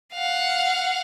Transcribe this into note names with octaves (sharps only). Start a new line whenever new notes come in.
F5 F#5